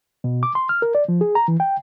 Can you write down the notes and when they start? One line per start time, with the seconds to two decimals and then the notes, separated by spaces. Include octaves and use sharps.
0.24 B2
0.43 D6
0.55 C6
0.69 F6
0.82 A#4
0.95 D5
1.08 F3
1.21 G#4
1.35 A#5
1.48 E3
1.60 G5